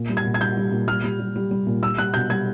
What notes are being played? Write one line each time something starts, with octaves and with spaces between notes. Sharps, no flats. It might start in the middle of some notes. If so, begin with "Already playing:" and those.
Already playing: A#2
G3
G#6
A#2
G#6
G3 G6
G3
A#2
G3 F6
G3
G3
G3
G3
A#2
G3 E6
G3 F#6
B2 G6
G3 G#6